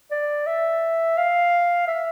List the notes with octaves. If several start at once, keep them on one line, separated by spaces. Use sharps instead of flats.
D5
E5
F5
E5